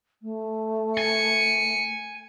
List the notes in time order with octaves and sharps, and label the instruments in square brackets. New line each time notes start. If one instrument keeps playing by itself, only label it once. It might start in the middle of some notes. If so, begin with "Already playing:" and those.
[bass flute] A3
[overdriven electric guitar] G#5 [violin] C#7